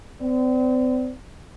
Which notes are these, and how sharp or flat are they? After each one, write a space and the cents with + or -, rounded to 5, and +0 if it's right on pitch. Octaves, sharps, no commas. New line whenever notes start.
C4 -40 D5 -30